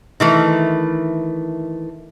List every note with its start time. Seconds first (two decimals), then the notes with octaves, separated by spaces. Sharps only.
0.20 D#3 E3 A3